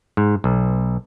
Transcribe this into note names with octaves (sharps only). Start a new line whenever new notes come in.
G#2
B1